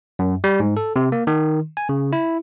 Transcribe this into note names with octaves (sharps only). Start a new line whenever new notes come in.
F#2
G3
G#2
A4
C3
A#3
D#3
G#5
C#3
E4